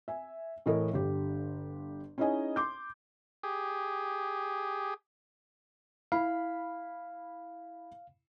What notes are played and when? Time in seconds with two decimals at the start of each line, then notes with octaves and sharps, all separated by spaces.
0.08 E5 G#5
0.66 A2 E3 E4 A4 A#4 D#5
0.93 G1 D3 G4
2.18 C#4 D#4 E4 G#4 D#5 G#5
2.56 C6 D6 G6
3.43 G4 G#4
6.12 E4 F5 B5